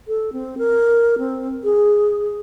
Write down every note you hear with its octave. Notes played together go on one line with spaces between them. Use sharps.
A4
C4
A#4
C4
G#4